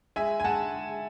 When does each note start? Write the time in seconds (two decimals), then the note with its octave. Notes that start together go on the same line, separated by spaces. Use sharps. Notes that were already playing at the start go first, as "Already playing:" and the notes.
0.16 G#3 E5 G#5
0.40 G#5
0.44 G#3 F#5 A5